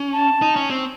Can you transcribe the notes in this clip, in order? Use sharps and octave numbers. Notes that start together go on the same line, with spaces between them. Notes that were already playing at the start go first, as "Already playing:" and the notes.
Already playing: C#4
A5
D#4
C#4
C4